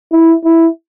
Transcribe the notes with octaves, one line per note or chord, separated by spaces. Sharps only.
E4
E4